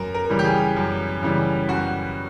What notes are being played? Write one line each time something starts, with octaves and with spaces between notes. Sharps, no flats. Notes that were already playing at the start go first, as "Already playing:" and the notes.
Already playing: F#2 A#4
A#4
C#3 E3 G3
G4
G#4
F#2
C#3 E3 G3
F#2 F#4